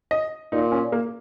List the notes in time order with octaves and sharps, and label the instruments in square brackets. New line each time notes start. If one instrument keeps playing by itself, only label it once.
[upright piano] D#5
[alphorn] A#2 [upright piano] D#4
[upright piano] C#4
A#3